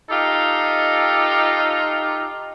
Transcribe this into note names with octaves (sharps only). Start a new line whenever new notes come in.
D#4 F4 G4 A4